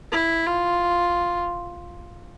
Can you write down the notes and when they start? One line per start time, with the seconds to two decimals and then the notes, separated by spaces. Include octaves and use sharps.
0.12 E4
0.46 F4